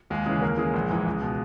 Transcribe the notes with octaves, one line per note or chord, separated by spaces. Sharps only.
D#2 G#3 G#4
C#3 E3 G#3 G#4
D#2 A#3 A#4
C#3 E3 G#3 G#4
A#1
G#2 E3
C#2
B2